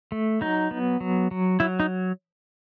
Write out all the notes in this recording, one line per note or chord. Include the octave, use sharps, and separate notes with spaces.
A3
F#3 D#4
B3
F#3
F#3
F#3 E4
D#4